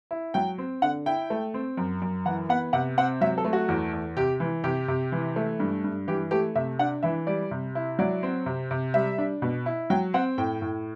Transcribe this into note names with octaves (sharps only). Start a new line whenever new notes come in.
E4
F#3 G5
C4
D3 F#5
E4 G5
A3
C4
F#2
F#2
E3 F#5
B3 F#5
C3 F#5
C4 F#5
F#3 E5
A4
A3
F#4
E2
E2
C3 G4
E3
C3 G4
C3
E3
A3
G2
G2
E3 G4
A3 G4
C3 E5
D4 F#5
E3 E5
G3 D5
C3
E4
F#3 D5
C4
C3
C3
G3 E5
D4
B2
E4
F#3 G5
C4 F#5
A2 G5
A2